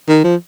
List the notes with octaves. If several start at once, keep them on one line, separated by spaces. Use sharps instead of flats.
D#3
F3